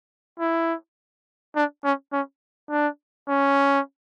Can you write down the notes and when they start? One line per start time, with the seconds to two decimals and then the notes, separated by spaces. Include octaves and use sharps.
0.40 E4
1.56 D4
1.84 C#4
2.13 C#4
2.70 D4
3.28 C#4